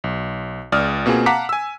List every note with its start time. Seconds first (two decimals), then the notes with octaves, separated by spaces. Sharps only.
0.04 B1
0.72 C#2 D5 D#6 F6
1.06 B2 A#3 C4 F4 G#4
1.26 F5 F#5 A5 A#5 D6 B6
1.49 G#5 E6